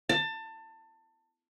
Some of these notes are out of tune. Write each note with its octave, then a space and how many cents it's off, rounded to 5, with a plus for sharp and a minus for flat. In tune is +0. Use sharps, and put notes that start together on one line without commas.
A5 +25